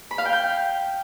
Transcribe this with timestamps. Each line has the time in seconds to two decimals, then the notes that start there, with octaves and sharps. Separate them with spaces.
0.11 B5
0.18 F5
0.25 G5
0.33 G6